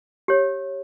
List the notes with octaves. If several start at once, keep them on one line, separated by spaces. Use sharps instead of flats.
G4 C#5